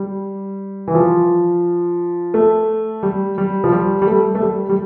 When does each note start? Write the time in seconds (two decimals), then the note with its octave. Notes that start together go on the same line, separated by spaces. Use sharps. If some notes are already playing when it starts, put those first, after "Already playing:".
Already playing: G3
0.88 E3
0.95 F3
2.34 A3
3.03 G3
3.38 G3
3.64 F3
3.72 G3
4.02 G3
4.07 A3
4.35 A3
4.42 G3
4.69 G3